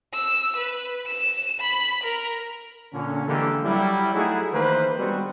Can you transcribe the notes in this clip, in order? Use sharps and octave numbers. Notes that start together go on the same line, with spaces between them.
E6
B4
E7
B5
A#4
A#2 D3 C#4
D3 E3 G#3 A#3 G4 A4
F#3 G3 E4
A3 D#4 E4 F#4 G#4
D#3 E3 A#3 B4 C5
G3 G#3 B3 C4 D4 F#4